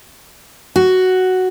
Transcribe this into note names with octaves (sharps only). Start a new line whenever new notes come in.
F#4